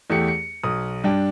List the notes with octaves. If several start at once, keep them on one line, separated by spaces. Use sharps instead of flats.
E2 A3 G4 C#7
C#7
B1 D#6
G2 D4 G5